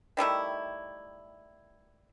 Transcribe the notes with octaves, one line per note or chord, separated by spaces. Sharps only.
D#3 G3 A3 E4